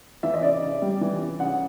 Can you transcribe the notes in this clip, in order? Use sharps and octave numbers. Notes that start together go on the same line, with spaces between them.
E3 E5
D#5
C#3 D5
C#3
G3
E3
C#3
C#3 F#5